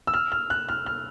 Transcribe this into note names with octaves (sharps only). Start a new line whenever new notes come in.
E6
F6
F6
F#6
F6
F6